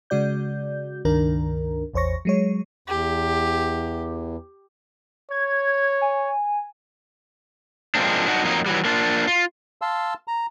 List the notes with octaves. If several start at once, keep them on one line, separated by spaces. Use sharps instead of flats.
C#3 G#3 F#4 D5 G6
C#2 G2 D#3 D4 A#4
A1 E2 C5 C#5 C#6 A#6
F#3 G#3 C#5
E2 G4
C#5 G#6
G#5
F3 G#3 A#3 C4 D4
D4 D#4 F#4
F2 F#3 A#3 D#4
E3 F#3 G3
A#3 D4 F4
F4
F5 A5 C6 E6
A#5